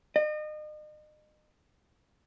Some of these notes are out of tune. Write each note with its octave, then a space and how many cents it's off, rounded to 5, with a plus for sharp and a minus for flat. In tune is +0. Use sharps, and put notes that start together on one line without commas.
D#5 -35